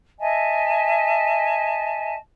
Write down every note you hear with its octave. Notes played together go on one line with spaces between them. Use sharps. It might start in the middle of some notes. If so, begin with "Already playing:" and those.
D#5 E5 G#5 A5